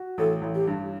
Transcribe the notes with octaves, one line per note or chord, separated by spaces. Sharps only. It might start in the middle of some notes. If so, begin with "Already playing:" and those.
Already playing: F#4
A1 A4
A1
G4
G2